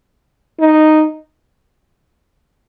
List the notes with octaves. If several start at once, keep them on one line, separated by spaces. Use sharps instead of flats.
D#4